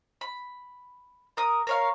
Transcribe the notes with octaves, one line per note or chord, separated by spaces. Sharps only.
B5
A#4 D#6
A#4 C#5 F5